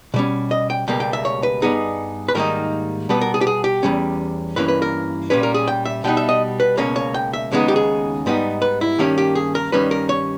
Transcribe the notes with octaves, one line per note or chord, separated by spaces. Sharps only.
B2 G3 C#4
D#5
G5
C#2 B2 G3 A#3 G5
G5
E5
C#5
B4
G2 G3 B3 D#4 G#4
B4
G#2 D#3 G3 A#3 D#4 A#4
B2 G3 B3 B4
A#4
G#4
G4
G#4
G4
E2 B2 G3 C#4
G2 E3 A#3 C#4 B4
B4
A#4
A#2 G3 C#4 B4
A#4
G#4
G5
E5
B2 G3 B3 D#4 G5
E5
D#5
B4
C#2 B2 A#3 C#4 C#5
C#5
G5
E5
D#2 C#3 G#3 B3 D#4
G4
G#4
G#2 G3 B3 D#4
B4
E4
G2 D#3 A#3 C#4 G4
G4
G#4
A#4
G2 D#3 G3 C#4 B4
A#4
C#5